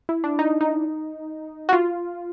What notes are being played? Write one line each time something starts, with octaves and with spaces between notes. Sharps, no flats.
E4
D4
D#4
D#4
F#4
F4